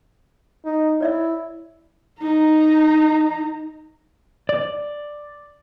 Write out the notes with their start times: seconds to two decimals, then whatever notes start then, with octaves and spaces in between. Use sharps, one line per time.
0.65 D#4
1.00 E4 C#5 D5 E5
2.21 D#4 A#5
4.49 D5